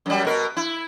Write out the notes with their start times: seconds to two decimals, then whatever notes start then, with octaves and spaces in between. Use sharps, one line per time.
0.06 F#2 G3
0.25 B2 A#4
0.57 E4